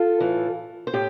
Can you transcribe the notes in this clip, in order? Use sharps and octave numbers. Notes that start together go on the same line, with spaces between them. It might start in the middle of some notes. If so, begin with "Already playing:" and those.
Already playing: F4 A4
A2 E3
C5
A2 G4